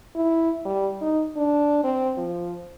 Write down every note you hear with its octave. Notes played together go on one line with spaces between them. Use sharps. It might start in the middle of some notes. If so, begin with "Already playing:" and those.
E4
G3
D#4
D4
C4
F3